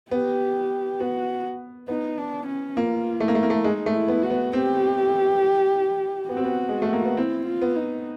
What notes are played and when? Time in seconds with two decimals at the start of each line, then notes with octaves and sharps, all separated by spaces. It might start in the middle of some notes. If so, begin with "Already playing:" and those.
0.11 B3 G4
1.00 B3 F#4
1.88 B3 D#4
2.18 D4
2.47 C#4
2.76 A#3 F4
3.20 A3 E4
3.28 A#3
3.35 A3
3.43 A#3
3.50 A3
3.64 G#3 D#4
3.86 A3
3.94 E4
4.08 B3
4.23 F#4
4.30 B3
4.53 C4 G4
6.29 B3 F#4
6.37 C4
6.45 B3
6.69 G#3
6.82 A3
6.93 A#3
7.05 B3
7.17 C4 E4
7.46 F4
7.62 B3
7.76 D#4